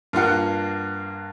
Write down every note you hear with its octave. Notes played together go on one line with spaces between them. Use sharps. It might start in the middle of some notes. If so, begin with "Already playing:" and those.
G2 A#3 F4 F#5